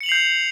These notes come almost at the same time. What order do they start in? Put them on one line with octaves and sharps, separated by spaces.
C#7 F#7 F7 C7 G6